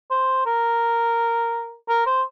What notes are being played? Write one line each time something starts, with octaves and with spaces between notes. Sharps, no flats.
C5
A#4
A#4
C5